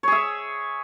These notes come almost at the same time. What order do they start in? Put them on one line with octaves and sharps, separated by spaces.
C#5 G#4 E5